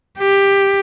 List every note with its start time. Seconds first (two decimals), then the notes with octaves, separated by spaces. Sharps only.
0.19 G4